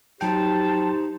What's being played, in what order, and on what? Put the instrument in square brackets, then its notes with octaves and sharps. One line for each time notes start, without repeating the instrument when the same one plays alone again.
[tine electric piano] F#3 G5 [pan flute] D#4 [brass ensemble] G4 C5 [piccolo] A5